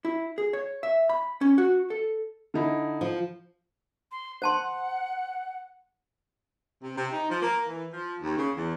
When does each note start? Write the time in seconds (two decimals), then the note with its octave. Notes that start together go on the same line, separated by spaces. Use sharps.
0.05 E4
0.38 G#4
0.53 C#5
0.83 E5
1.09 B5
1.41 C#4
1.58 F#4
1.90 A4
2.54 D3 D#4 E4
3.01 F3
4.12 C6
4.42 C5 F#5 A5 C6
6.82 C3
6.98 C3
7.12 D#4
7.29 F3
7.42 A#3
7.68 E3
7.92 F3
8.22 D#2
8.38 C#3
8.55 E2